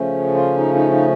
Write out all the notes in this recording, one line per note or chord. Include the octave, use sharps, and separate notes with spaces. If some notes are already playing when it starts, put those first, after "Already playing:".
Already playing: C#3 F3 A3 C#4
F4
D#4
D#4
D#4